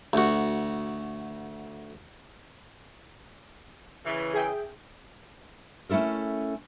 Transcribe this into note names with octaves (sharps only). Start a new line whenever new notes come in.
D2 F#4
C#3 E3
G#4 E5 G5
A3 C#4 E4 A4 A#4